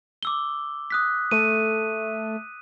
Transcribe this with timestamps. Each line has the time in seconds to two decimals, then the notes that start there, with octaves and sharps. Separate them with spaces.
0.23 D6 E6 G7
0.90 D#6 F#6 B6
1.31 A3 D#7